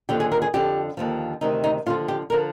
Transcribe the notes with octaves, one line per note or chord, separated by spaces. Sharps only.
D#2 D3 F3 G4
G#4
A#4
G#4
F2 D3 F3 G4
D#2 D3 F3
D2 C3 D#3 D#4
D#4
D#2 D3 F3 F4
G4
D3 F3 A#4